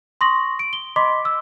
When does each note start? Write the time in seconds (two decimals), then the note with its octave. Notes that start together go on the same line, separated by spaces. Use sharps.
0.21 C6 C#6 D#6 A#6 F#7
0.59 D7
0.73 G7
0.96 D#5 B5 C6 D6 B6
1.25 E6